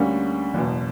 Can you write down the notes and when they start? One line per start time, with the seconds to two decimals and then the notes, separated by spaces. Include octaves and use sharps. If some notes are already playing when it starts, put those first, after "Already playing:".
Already playing: D2 D3 G3 A#3 C#4
0.54 F#1 E2 B2